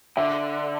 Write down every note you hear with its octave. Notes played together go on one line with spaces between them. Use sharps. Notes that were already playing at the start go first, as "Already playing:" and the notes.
D3 E5